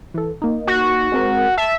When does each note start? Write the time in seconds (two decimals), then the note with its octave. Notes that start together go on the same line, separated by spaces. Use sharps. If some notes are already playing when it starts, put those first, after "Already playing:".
0.14 E3 A4
0.42 A#3 D#4
0.67 F#4
1.12 G#3 C4 A#4
1.58 E5 A5